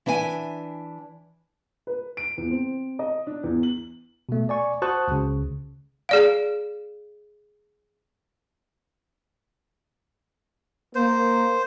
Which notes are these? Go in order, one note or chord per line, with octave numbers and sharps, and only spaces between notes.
E3 D4 E5 G#5
B4
D7
E2
C4
D#5
D4
E2
F#7
B2 A3
D5 G#5 C#6
F#4 C5 A5 C#6 D#6 F#6
C#2 C#3
G#4 D5 F5
A#3 C5